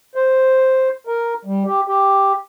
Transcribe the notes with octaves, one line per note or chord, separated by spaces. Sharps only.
C5
A#4
G3
G4
G4